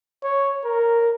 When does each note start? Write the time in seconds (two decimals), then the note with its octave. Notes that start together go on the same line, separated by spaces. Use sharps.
0.23 C#5
0.65 A#4